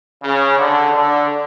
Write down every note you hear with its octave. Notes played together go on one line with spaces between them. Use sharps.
C#3
D3
D3